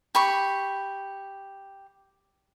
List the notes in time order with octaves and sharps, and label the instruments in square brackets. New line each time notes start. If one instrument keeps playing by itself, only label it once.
[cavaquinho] G4 B5 C#6